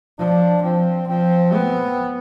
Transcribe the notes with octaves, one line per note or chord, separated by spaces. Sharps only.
F3 D4
F3 C4
F3 C4
B3